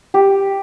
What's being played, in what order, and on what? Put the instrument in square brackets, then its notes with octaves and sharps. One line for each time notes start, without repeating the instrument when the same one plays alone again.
[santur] G4